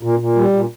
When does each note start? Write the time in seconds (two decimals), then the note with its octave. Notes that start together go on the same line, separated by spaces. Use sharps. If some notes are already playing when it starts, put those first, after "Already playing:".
0.03 A#2
0.19 A#2
0.36 G3
0.53 A#2